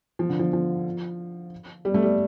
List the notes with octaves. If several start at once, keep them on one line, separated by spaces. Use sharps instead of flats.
F3
D3
F3
F3
G3
A3
G3